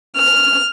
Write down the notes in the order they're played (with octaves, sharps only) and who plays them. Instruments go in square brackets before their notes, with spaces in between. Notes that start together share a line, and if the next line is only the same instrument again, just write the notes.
[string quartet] F6